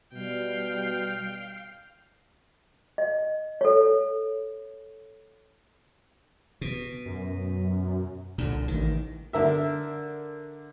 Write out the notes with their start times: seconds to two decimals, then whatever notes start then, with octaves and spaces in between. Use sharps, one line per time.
0.14 B2 G3 F5 G5
2.98 D#5
3.61 A4 C#5
6.61 B2
7.06 F#2
8.38 C2 A#2 D3
8.68 A1 D#3
9.33 D3 A#4 E5